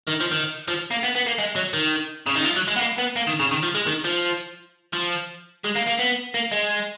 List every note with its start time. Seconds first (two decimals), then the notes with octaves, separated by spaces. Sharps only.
0.08 D#3
0.21 F3
0.32 D#3
0.68 F3
0.91 A#3
1.03 B3
1.15 B3
1.26 A#3
1.39 G#3
1.56 F#3
1.73 D#3
2.26 C#3
2.36 D#3
2.44 F3
2.56 F#3
2.68 G#3
2.76 B3
2.79 A#3
2.98 B3
3.16 A#3
3.27 D#3
3.40 C#3
3.51 D#3
3.63 F3
3.75 G#3
3.87 D#3
4.05 F3
4.93 F3
5.64 G#3
5.75 A#3
5.87 A#3
5.99 B3
6.34 A#3
6.52 G#3